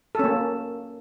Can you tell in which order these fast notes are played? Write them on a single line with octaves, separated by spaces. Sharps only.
A4 C#4 A#3